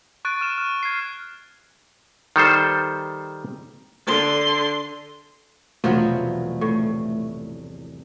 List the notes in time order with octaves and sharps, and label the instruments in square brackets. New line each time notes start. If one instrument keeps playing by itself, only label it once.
[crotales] C#6 F#6 A6 D7
F6 E7
F6
G#6 C7
[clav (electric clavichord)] D#3 G3 A4 C5
[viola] D3 C6
[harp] E1 C2 B6 [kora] F3 F#3 B3 [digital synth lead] A3
[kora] A2 [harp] C7